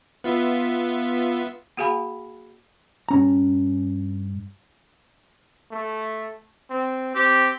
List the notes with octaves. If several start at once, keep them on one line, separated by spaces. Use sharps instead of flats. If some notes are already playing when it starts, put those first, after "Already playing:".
B3 F4 E5
A#3 F#4 G#4 F5 G#5 B5
G2 C#4 A#5
A3
C4
C4 G4